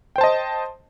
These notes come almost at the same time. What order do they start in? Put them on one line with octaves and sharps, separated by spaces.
G5 C5 A5 D#5